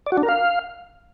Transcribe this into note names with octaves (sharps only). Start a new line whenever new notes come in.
D5
F#4
D4
A#4
F5